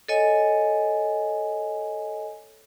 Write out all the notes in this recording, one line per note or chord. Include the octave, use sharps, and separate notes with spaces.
A4 C#5 D#5 G#5